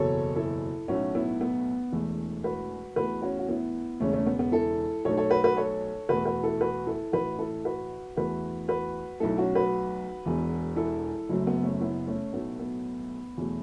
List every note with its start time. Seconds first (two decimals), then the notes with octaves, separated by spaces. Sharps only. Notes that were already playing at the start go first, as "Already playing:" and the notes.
Already playing: F#1 E2 B2 F#3 A4 C#5
0.36 E4 A4
0.88 B1 A2 A3 C#4 F#4
1.15 B3 E4
1.41 B3
1.92 E1 E2 E3 A3
2.44 F#4 B4
2.96 E2 E3 A3 F#4 B4
3.22 C#4 F#4
3.39 F#4
3.49 B3 E4
4.00 E1 E2 C#3 A3 C#4
4.13 A3 C#4
4.27 B3
4.39 B3
4.52 E4 A4
5.05 B1 B2 A3 A4 C#5
5.17 A4 C#5
5.30 F#4 B4
5.44 F#4 B4
5.57 A4 C#5
6.09 E2 B2 A3 F#4 B4
6.25 F#4 B4
6.44 E4 A4
6.61 F#4 B4
6.87 E4 A4
7.12 A1 A2 E3 F#4 B4
7.39 E4 A4
7.65 F#4 B4
8.16 E2 E3 A3 F#4 B4
8.68 F#4 B4
9.20 B1 B2 F#3 A3 E4 A4
9.38 C#4 F#4
9.55 F#4 B4
10.26 E1 E2 B2
10.76 E4 A4
11.29 F#1 F#2 F#3 A3
11.47 B3
11.63 A3 C#4
11.81 B3 E4
12.07 A3 C#4
12.33 B1 A2 F#3 A3 B3
12.59 B3
13.38 E2 B2 F#3 A3